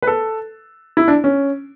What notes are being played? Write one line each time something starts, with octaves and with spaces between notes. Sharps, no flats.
B4
A4
E4
D4
C#4